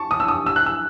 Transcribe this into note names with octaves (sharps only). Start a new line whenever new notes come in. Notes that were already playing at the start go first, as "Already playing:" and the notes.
Already playing: A5 C#6
D#6
E6
D#6
E6
F#6
E6